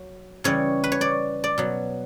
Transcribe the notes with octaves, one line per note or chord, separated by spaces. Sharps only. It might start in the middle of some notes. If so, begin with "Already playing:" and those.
Already playing: F#3
C#3 E3 G3 C#5
B4
C#5
D5
D5
B2 F#3